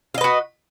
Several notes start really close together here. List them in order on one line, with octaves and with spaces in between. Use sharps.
F5 D#5 B4 F#4